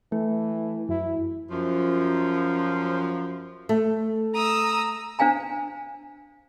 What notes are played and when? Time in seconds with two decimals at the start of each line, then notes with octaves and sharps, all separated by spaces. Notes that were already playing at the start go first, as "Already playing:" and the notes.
0.12 E3 A3
0.89 F#2 E4
1.51 F#2 F3
3.69 A3
4.35 A#5 D#6 E6
5.19 D4 C5 F5 G#5 A#5